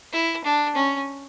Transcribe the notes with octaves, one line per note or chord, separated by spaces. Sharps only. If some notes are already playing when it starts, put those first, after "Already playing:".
E4
D4
C#4